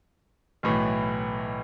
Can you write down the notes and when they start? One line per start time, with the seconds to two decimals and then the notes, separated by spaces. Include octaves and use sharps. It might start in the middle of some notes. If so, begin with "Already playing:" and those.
0.63 B1 A2 E3